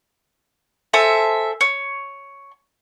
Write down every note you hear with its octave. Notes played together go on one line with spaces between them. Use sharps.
A4 C5 E5 G#5
C#5